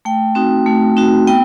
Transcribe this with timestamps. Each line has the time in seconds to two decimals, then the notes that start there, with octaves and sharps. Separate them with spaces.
0.05 A3 G5
0.35 C4 D#4 F#4
0.66 A3
0.97 C4 D#4 F#4
1.27 B3 G5